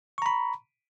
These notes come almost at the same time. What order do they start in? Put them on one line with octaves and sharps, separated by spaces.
C#6 A#5 B5